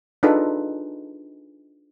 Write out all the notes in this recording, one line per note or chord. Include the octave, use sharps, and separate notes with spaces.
D4 D#4 F4 G#4 A4 B4